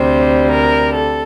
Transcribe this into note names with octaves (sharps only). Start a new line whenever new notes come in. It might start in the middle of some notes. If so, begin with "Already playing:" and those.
Already playing: D2 C3 G3 C5
A#4
A4